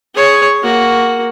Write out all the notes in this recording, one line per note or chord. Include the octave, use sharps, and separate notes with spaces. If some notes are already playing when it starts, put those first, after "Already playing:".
G#4 C#5
A#3 F#4